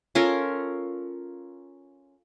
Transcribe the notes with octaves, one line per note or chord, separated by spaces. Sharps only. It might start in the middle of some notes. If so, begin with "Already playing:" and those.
C#4 F4 A4 A#4